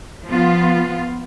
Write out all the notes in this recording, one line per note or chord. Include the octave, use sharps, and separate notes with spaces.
F3 B3 F4